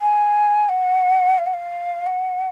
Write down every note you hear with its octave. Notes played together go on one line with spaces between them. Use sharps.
G#5
F#5
F5
F#5
F5
F#5